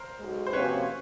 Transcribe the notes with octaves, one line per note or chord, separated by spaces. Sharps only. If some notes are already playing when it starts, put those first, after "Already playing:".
Already playing: A#4 C5
B1 B2 G#3
C5
C3 F3 A#3 C#4 F#4 B4 C#5